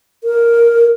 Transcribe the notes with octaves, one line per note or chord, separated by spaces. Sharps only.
A#4